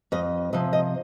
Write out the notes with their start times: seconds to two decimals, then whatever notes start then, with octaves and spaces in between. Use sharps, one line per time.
0.12 F2 D#5
0.53 C3 F3 D#5
0.73 D#5